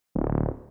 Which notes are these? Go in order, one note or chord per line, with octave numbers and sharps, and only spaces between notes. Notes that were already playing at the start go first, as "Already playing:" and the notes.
D1